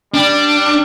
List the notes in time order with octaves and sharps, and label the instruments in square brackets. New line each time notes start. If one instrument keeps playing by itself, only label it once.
[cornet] G3 [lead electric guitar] D4